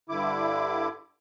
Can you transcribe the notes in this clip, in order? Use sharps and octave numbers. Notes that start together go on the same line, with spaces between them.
G2 D3 E4 D6